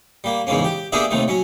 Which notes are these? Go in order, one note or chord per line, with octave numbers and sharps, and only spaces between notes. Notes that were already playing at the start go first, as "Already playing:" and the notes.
G3 A#3
E2 G#2 C#3 A#3 C#4
G4
A#3 B3 D4 G4 G#4 E5
D#2 C3 D#3 A3
F#3 C#4